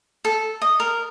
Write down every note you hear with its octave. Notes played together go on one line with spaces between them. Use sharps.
A4
D#5
A#4